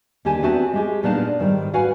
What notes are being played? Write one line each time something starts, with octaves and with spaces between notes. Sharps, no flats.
D#2 D3 G4 G#5 A5
B3 C4 F#4 E5 G#5 A5
G#3 G4 G#4
A#2 B3 D4 D#4 F5 A5
G#2 D#3 G3
F#4 B4 F5 F#5 G#5